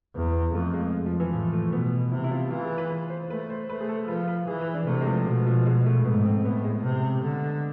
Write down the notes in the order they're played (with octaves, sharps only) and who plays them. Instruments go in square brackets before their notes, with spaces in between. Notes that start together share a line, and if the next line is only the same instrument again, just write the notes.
[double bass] E2 [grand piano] B3
[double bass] F2 [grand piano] A3
[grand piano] G#3
F3
E3
[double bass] A2 [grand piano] F3
[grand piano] A3
[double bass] B2 [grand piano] B3
[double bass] C3 [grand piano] E4
[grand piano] E4
F4
[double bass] E3 [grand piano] F4
[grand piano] G#4
B4
B4
C5
[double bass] A3 [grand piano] B4
[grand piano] C5
[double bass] A3 [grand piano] B4
[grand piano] G#4
A4
[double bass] F3 [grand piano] B4
[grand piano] B4
[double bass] E3 [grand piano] G#4
[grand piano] B4
D4
[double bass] C3 [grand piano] A3
[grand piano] G#3
F3
[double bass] B2 [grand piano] F3
[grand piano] F3
G#3
A3
[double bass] G#2 [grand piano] B3
[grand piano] C4
[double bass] A2 [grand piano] B3
[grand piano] G#3
[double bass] C3
D3